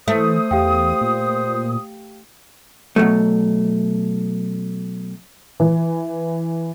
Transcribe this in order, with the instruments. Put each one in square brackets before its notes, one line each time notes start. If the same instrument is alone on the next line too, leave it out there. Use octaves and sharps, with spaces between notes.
[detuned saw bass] E3 [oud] A3 [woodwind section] C5 D#6
[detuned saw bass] E2 [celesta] G4 F5 G5
[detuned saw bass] A#2
[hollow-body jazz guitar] B2 E3 F#3 A3
[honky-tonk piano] E3